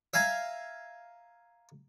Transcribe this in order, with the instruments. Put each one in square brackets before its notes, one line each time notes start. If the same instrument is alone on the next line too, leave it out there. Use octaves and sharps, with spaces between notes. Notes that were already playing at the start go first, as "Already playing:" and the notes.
[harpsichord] E5 F5 G#5 A#5